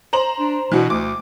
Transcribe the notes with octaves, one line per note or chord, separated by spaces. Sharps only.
C5 A#5 F#7
D4
B2 E3 D4 F#4
D2 D6